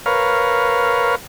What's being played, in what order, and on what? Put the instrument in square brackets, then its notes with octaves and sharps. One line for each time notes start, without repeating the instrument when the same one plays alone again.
[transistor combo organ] A#4 B4 C#5 F5